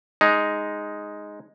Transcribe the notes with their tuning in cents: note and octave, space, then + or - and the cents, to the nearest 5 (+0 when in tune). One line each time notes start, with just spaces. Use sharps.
G#3 +0 D#4 +0